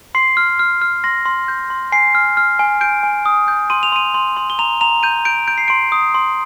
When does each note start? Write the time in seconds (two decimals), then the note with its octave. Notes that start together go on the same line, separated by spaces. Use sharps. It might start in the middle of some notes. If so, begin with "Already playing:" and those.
0.15 C6 C7
0.37 F6
0.59 F6
0.82 F6
1.04 C6 A#6
1.26 C6
1.48 G6
1.70 C6
1.92 G#5 C7
2.15 F6
2.37 F6
2.59 G#5
2.81 G6 D7
3.03 G#5
3.26 D#6
3.48 G6
3.70 C6 D#7
3.83 F7
3.92 C6 D#7
4.14 C6
4.37 C6
4.50 G7
4.59 A#5 F7
4.81 A#5 F7
5.03 G6 D#7
5.25 G6 D7
5.48 G6 D7
5.58 C7
5.68 C6 D7
5.92 D#6
6.14 C6